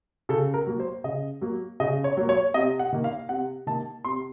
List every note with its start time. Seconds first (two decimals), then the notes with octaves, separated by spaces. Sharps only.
0.29 C#3 A4
0.54 A#4
0.67 F#3 A#3
0.80 C5
1.04 C#3 D#5
1.41 F#3 A#3
1.80 C#3 D#5
2.04 C#5
2.17 F#3 A#3
2.29 C#5
2.54 C3 D#5
2.79 F#5
2.92 D#3 A#3
3.04 F5
3.29 C3 F#5
3.67 D#3 A#3 A5
4.05 C3 C6